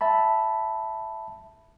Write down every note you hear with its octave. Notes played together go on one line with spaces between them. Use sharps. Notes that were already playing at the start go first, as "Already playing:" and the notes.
E5 A5 B5